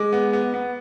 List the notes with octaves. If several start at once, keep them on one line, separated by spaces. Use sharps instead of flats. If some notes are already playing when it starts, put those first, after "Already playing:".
Already playing: G#3 D6
B3
B3
B3